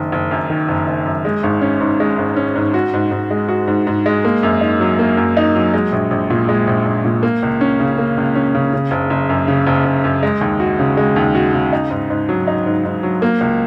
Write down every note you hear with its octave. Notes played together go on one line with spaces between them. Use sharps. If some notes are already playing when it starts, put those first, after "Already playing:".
Already playing: F#1 D#3
F#1
F#2
D#3
F#1
F#1
F#2
G#3
G#1
C#4
G#2
G#3
G#1
C#4
G#2
F#4
G#2
G#2
G#3
F#4
G#2
G#2
G#3
A#3
F#2
D#4
F#3
A#3
F#2
D#4
F#3
G#3
A#1
A#1
A#2
G#3
A#1
A#1
A#2
A#3
C#2
C#4
C#3
A#3
C#2
C#4
C#3
C#3
F#1
F#1
F#2
C#3
F#1
F#1
F#2
G#3
D#2
F#4
C#3
G#3
D#2
F#4
C#3
D#4
G#2
G#2
F#3
D#4
G#2
G#2
F#3
A#3
C#2